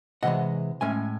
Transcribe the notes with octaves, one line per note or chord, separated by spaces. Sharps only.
C3 E3 G#3 D#5 F#5
A2 G#3 C#4 E5 G#5